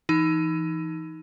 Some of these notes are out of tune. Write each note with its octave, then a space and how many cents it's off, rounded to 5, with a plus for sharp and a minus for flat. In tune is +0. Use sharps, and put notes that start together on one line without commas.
E3 +15 D#4 +15